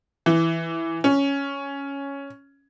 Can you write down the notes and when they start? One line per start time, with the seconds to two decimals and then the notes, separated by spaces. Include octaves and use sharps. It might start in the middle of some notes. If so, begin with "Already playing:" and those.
0.26 E3
1.04 C#4